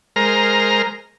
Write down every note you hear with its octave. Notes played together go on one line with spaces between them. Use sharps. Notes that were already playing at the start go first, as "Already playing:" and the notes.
G#3 A#4 C5 A#5 F6